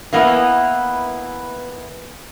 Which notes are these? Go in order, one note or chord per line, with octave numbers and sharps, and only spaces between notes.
E3 A#3 B3 E4